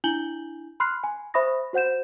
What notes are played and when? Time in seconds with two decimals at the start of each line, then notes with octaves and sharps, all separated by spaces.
0.04 D4 E4 G#5 G6 F#7 G7
0.80 B5 C6 F6 F#6 C7
1.04 G#5
1.34 C5 E5 B5 C#6 D#6 A#6
1.73 F#4 C5 F#5 G6 E7